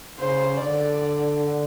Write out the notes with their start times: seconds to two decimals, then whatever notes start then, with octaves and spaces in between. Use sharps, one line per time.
0.20 C#3 C5
0.60 D3 D5